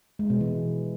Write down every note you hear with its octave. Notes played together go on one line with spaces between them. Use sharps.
G#3
B2
E3